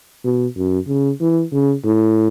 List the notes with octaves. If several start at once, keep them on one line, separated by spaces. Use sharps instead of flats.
B2
F#2
C#3
E3
C#3
A2